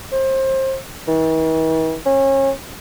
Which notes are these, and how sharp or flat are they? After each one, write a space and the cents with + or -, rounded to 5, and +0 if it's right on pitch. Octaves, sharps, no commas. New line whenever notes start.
C5 +25
E3 -45
C#4 -30